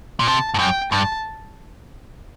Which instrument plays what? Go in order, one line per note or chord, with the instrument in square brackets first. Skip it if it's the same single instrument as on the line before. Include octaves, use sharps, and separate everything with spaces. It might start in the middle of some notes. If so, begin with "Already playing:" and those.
[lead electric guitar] A#2
[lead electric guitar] C3 [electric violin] A5
[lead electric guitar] G2
[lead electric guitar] F#2 [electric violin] G5
[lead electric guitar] G2 [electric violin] A5